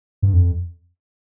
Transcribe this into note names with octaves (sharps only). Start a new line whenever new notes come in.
G2
F2